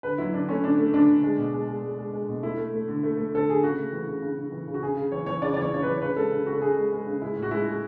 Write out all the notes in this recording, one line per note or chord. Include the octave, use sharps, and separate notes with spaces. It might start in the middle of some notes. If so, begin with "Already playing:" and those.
D3 B4
F#3 E4
D3 D4
A3 C#4
D3 D4
A3
D3 D4
D3
G#3
B2
G#3
G#3
G#3
G#3
G#3
B2
A3 E4
A3
A3
D3
A3
A3
D3 A4
D3 G#4
C#3 F#4
A3
E3
C#3
C#3
C#3
E3
C#3
F#4
C#3 G#4
C#3
E3 C#5
E3 C#5
C#3 D5
D5
E3 C#5
C#3 C#5
E3 B4
C#5
C#3 B4
G#3 A4
C#3
C#3 F#4
A4
C#3 G#4
G#3
G#3
C#3
G#3 E4
A2
F#4
G#3 E4
G#3